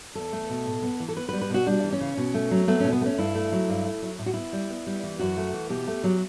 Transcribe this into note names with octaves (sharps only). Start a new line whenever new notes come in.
E2 A4
A3
B2
A2
B3
E3
A4
B3 B4
B4
G3
B4
B2 F#4
G3 D4
E3
C#4
C#3
B2
A3
F#3
A3 B3
B2 C#4
B3
A3 C#4
G2 E4
A3
F#3
G2
A3
F#3
A2 E4
F#4
B3 E4
G3
B3
G3
E3
F#2 F#4
A3
E3
B2 G4
A3
F#3